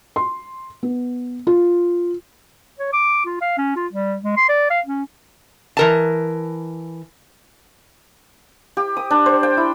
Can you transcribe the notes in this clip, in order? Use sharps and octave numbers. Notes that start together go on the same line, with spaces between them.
C6
B3
F4
C#5
D6
F4
F5
C#4
F4
G3
G#3
C6
D5
F5
C#4
E3 A#4 A5
G4
D#6
D4
C5
G5
E4